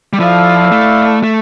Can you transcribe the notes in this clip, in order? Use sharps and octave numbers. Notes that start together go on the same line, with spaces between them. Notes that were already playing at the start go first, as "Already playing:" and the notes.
G3
F3 E4 A4 D5 F5
A3
A3